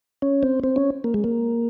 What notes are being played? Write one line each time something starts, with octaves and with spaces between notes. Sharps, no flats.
C#4
C4
C4
C#4
A#3
G#3
A#3